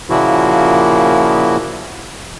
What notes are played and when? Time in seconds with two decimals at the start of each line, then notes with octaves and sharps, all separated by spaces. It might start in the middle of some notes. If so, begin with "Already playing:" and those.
0.10 A#2 C#3 F3 A#3 E4 F#4